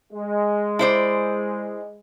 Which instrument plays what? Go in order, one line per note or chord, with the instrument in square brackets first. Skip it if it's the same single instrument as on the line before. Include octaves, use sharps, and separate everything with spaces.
[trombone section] G#3
[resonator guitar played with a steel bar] E4 C5 D5